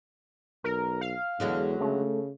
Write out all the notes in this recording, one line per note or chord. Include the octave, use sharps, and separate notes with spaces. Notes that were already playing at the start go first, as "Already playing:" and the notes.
B1 A#4
F5
E2 D3 F#3 G#3
C#3 A3